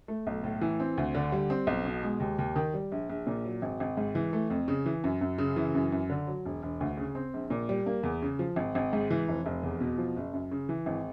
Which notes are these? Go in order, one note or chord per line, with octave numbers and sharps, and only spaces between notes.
A3
B1
A2
E3
C4
D2
D3
G3
C4
B1
B2
G#3
D#2
D#2
D#3
G3
A#1
A#1
A#2
F#3
G#1
G#1
G#2
E3
A3
F2
C#3
E3
F#2
F#2
C#3
E3
F#2
F#2
D3
F#3
E1
E1
D2
C#3
C4
A#1
A#2
G3
A#3
E2
C#3
F3
G#1
G#1
G#2
E3
F1
F1
E2
B2
F3
F#1
F#2
C#3
E3
G#1